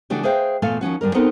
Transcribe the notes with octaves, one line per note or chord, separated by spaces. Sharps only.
C#3 E3 A3 D4 F#4 G4
G#4 B4 C5 E5 F5 G5
E2 A#2 A3 A4 F5 G#5
D#2 F3 C#4 F#4
F#2 D3 G3 A#4
B3 C4 D#4 A4 A#4